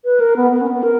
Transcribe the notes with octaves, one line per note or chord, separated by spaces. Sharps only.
B4
A#4
B3
B3
C#4
B3
A#4